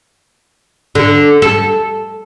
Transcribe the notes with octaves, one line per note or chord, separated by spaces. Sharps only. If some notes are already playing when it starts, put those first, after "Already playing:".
D3
A4